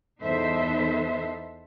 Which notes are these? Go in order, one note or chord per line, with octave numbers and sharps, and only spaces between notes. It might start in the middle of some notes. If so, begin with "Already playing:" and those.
E2 D#4 A4 B4 C5 E5